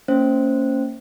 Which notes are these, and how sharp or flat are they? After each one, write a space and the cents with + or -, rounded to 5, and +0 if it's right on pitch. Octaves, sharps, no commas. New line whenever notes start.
A#3 -20 C#4 +0 C5 +0